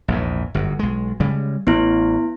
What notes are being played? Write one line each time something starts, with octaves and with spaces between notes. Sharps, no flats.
A#1 E2 G#2
G1 F#2
B1 G#3
C#3 G3 G#3
A1 B3 E4